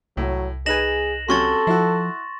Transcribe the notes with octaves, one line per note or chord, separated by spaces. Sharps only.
C2 A2 F#3
D#4 G#4 B4 G#5 A#6 E7 F#7
C3 F#3 C#4 A4 C6 C#6 A6
F3 E4 F#4